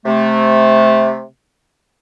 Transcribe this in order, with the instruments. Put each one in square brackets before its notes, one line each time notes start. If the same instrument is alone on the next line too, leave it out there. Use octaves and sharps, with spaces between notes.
[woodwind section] C3 A3